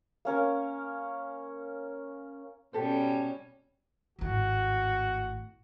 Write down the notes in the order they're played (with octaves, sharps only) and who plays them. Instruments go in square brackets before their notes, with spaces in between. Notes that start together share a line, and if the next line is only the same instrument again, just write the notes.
[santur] A#3 C#4 A#4
[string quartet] B2 G3 C#4 [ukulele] G4 A4 C5
[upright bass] G#1 A2 [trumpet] F#4